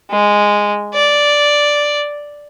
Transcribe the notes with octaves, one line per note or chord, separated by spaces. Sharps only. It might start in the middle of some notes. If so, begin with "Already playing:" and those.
G#3
D5